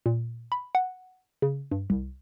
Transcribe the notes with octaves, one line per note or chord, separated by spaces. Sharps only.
A#2
B5
F#5
C#3
G2
C2